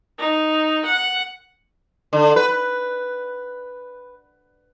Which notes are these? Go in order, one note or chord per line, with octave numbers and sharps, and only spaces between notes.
D#4
F#5
D3
B4